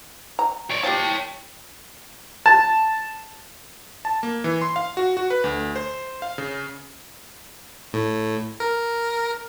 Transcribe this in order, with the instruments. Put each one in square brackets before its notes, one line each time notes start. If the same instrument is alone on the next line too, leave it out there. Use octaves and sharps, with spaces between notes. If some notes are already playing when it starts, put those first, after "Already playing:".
[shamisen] A#5
[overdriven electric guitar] C#5 D5
[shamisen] F3 G4 [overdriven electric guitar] C#5 A5 [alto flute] G5
[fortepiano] A5
[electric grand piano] A5
A#3
E3
C6
F5
F#4
F#4
B4
D2
C5
F5
C#3
[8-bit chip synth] A2
A#4